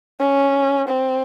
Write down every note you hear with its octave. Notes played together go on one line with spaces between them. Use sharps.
C#4
C4